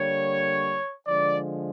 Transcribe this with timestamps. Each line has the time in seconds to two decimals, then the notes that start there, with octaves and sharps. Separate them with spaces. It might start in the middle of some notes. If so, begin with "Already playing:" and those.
Already playing: D3 G3 A#3 C#5
1.07 D3 F3 G#3 D5